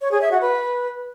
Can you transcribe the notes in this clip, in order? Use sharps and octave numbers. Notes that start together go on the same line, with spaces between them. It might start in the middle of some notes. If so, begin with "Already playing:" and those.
C#5
G#4
E5
F#4
B4